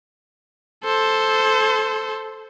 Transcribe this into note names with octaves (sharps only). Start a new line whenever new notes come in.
A4 C5